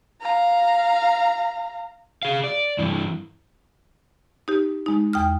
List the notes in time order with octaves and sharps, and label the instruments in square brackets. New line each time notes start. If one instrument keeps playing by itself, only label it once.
[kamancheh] F5 A#5
[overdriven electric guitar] G#4 F5
D5
G2 E3
[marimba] D#4 G4
G#3 D#4
E2 G5 D#6 F6